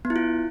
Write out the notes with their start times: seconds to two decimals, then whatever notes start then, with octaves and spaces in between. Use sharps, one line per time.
0.05 B3
0.10 E4
0.16 F4